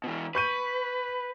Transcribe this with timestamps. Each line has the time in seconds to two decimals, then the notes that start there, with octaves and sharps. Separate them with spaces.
0.04 B2 E3
0.35 B4 C#6 G6 D#7